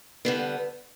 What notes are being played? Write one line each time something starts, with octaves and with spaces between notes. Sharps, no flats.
D3 G3 B3